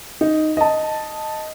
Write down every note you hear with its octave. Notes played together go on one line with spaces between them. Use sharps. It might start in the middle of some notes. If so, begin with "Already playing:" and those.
D#4
D#5 A5